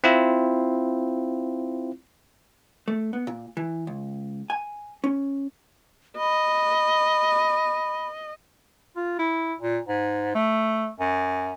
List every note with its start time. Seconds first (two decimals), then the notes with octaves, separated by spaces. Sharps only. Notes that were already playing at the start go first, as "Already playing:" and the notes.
0.04 C4 E4 F4
2.88 A3
3.13 B3
3.27 A#2
3.57 E3
3.87 C#2
4.50 G#5
5.04 C#4
6.18 D#5 B5
8.96 F4
9.19 E4
9.59 A#2
9.87 G#2
10.35 A3
11.00 F#2